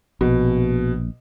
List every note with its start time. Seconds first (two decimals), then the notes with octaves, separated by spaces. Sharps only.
0.21 A#1 B2